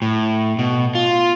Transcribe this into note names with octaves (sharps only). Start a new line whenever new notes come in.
A2
B2
F4